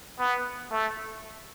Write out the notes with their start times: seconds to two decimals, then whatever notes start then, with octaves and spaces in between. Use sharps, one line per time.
0.19 B3
0.71 A3